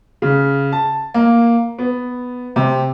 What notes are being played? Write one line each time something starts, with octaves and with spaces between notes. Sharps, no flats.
C#3
A5
A#3
B3
C3